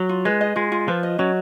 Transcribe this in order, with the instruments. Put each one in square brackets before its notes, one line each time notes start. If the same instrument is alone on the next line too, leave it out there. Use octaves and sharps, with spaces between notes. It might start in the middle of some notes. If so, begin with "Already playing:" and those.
Already playing: [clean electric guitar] F#3
[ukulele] F4
[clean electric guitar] G#3 [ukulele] B4
[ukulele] D#5
[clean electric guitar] G#3 [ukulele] F4
[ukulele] F4
[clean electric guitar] F3 [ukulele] B4
[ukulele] D#5
[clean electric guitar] F#3 [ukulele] C#4